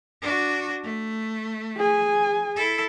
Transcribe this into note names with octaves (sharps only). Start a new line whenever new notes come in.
D4 F#4
A3
G#4 G#5
E4 A4